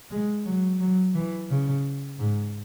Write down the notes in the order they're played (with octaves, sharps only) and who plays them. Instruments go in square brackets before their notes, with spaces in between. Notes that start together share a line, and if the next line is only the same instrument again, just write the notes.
[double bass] G#3
F#3
F#3
E3
C#3
G#2